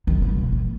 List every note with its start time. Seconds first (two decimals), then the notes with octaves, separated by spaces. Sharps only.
0.07 D#3
0.22 C#3
0.38 B2
0.52 A#2